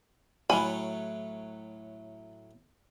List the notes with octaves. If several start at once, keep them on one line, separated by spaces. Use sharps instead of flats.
A2 F#3 G#5 B5